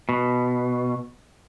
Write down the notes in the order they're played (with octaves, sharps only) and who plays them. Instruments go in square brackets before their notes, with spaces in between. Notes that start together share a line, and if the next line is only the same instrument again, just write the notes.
[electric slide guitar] B2